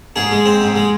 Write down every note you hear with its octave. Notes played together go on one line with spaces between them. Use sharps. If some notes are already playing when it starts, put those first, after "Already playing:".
G#2 G#4
G#3
C4
G#2
G#3